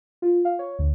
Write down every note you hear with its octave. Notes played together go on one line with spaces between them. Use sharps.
F4
F5
C#5
D2